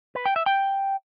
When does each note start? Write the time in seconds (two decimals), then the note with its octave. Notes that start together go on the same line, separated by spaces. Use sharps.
0.15 B4
0.26 G5
0.36 E5
0.46 G5